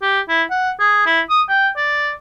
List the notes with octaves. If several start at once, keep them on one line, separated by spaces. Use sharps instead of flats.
G4
E4
F#5
G#4
E4
D#6
G5
D5